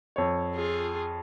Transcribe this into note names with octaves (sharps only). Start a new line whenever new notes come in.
F2 C#5
F4 G#4